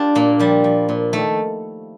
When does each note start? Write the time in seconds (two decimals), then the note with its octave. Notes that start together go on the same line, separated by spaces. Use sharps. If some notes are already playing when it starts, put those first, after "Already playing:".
Already playing: D4 F4 G4
0.15 A#2 A#3
0.39 F3 G3
0.64 F3
0.89 A#2
1.13 D#3 A3